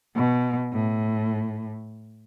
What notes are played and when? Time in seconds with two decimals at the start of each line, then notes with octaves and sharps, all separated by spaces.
0.16 B2
0.73 A2